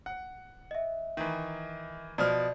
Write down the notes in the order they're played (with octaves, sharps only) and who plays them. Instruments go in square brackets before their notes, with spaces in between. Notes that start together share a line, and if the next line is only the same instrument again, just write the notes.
[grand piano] F#5
[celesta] D#5 E5
[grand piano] D#3 E3
[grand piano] B2 F3 F6 [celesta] D5